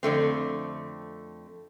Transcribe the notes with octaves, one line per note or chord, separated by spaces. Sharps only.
F2 D3 A3 C4